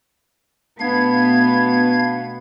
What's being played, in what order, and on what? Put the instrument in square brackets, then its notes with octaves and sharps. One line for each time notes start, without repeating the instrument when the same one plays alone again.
[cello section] B2 A3 B3 [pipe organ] D4 F5 G#6